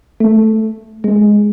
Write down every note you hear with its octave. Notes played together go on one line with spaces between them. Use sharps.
A3
G#3